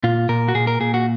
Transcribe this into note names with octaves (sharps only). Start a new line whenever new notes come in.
A#2 F4
A#2 A#4
F#4
A#2 G#4
A#4
A#2 G#4
F#4